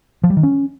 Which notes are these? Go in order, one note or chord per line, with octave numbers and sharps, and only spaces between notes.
F3
G3
D#3
C#4